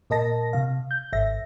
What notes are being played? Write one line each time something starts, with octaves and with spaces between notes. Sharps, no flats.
A#2 A#4 D#5 A5 A#6
C3 F5
G6
G#1 E5 A#6